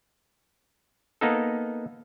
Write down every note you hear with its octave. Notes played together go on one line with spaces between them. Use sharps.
A#3 B3 D#4 A4